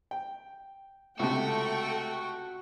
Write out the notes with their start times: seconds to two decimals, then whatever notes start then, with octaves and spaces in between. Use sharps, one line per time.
0.11 G5
1.19 C#2 C3 A3 F#4 A4 G5 C#6